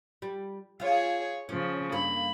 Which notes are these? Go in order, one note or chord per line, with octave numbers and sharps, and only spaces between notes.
G3
F4 G#4 C#5 F5
C#3 F3 C#4
G2 A#3 B5